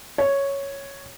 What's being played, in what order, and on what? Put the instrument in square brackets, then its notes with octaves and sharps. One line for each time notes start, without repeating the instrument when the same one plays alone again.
[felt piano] C#5